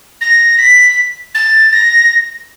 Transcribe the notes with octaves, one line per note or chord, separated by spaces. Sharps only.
A#6
B6
A6
A#6